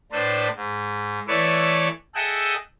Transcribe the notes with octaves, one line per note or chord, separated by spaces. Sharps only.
A2 D4 A4 B4 C5
G#2
E3 A3 B4 C#5 D5 E5
G#4 A4 D#5 E5 F#5 G5